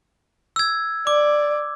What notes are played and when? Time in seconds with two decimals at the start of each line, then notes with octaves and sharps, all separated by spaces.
0.56 E6 G#6
1.07 D5 D6